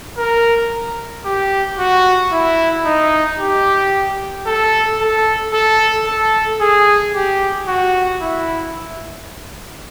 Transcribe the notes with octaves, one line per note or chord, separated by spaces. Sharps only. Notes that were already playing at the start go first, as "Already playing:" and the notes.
A#4
G4
F#4
E4
D#4
G4
A4
A4
A4
A4
G#4
G4
F#4
E4